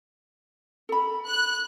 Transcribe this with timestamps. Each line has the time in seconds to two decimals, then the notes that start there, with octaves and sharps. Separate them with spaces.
0.89 A4 B5
1.28 F#6